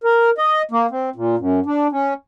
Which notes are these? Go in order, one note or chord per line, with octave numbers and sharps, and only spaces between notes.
A#4
D#5
A#3
C4
A#2
F#2
D4
C#4